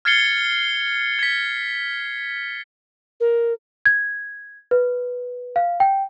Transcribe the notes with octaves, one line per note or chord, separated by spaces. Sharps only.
F6 G#6 A6 C7 C#7 G7
G#6 B6
A#4
G#6
B4
F5
G5